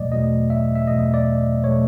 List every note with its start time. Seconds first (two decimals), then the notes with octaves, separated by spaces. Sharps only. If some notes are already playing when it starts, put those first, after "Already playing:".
Already playing: E2 B2 F#3 A3 D5 D#5
0.12 E2 B2 F#3 A3 D#5
0.50 E5
0.75 E5
0.87 E2 B2 F#3 A3 D#5
1.14 D5
1.64 B2 F#3 A3 C#5